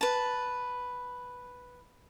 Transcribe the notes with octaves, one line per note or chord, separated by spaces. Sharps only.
B4 A5